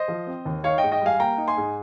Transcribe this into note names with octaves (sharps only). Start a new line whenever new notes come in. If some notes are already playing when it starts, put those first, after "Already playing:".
Already playing: C5 D#5
F3
C4
D#2
D#4 C#5 F5
G#2 D#5 G5
D#5 G5
G3 F5 G#5
A#3 G5 A#5
D#4
G#5 C6
G#2